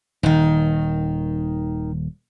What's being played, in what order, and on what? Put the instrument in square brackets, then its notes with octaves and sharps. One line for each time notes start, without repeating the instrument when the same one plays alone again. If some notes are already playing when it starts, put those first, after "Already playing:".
[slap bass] D#1 [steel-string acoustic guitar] D#3 D#4